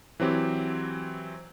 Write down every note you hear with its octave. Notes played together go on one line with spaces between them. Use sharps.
E3 F#3 C4 G4